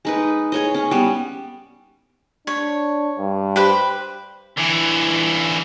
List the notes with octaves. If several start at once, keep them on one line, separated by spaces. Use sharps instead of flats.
G#3 D#4 B4
G#4 C#5 D#5
C#4
G3 B3
D4 C#5
G2
G4 B4 C5
D3 E3